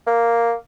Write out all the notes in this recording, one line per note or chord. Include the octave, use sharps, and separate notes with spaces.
A#3